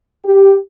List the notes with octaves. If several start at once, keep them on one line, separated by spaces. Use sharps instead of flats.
G4